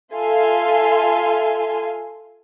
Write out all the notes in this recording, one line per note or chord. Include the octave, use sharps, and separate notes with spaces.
F4 A4 E5 F5 G#5 C6